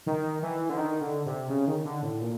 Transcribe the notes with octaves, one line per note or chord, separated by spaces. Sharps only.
D#3
E3
D3
D#3
D3
C3
C#3
D#3
D3
A2
A#2